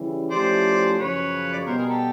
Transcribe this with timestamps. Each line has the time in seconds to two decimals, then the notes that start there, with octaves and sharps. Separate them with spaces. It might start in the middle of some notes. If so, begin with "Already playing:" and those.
Already playing: C#3 E3 G3
0.30 F3 A3 C#4 E4 G4 C5 D5
0.98 F#2 C#3 F3 B4 C#5
1.53 D5
1.59 C#5
1.66 B2 G3 B3 A#4 C5
1.78 G#4 A#4
1.89 G4 A4